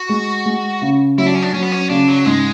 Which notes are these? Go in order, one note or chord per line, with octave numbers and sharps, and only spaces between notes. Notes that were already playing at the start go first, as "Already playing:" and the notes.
Already playing: F#4
G#3
G#3
C#3
F#3 E4
D4
C#4
D4
F#3 C#4
B3
C#4
C#3 D4
F#3
G#2 G#3